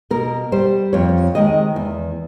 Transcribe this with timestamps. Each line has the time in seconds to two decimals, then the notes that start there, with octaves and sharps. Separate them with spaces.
0.10 B2 A#4
0.52 G3 C5
0.93 F2 C#5
1.35 C3 D#3 G#3 D#5
1.76 E2